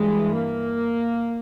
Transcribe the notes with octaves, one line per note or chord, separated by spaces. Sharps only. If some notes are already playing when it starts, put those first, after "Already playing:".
Already playing: G2 E3 G#3
A#3